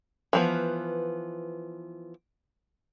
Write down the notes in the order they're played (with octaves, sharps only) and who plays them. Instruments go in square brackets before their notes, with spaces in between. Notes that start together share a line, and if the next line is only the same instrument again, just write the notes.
[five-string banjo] E3 F3 B3